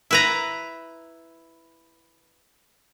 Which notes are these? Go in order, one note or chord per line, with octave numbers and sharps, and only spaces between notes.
E4 B4 A#5